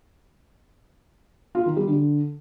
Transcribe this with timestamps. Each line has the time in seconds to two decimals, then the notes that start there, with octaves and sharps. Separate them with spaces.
1.55 F4
1.66 D#3
1.77 G3
1.87 D3